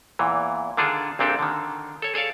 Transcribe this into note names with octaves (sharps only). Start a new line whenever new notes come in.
E2 A#2 E3
D3 D#3 D4 F4 G#4 A4
A#1 A#2 C4 D4 G4 A4
D3 D#3
A4 C#5
G#4 A4 C#5 D5 F5